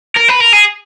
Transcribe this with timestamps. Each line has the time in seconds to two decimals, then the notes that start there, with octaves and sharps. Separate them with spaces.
0.17 A#4
0.29 B4
0.41 A#4
0.53 G#4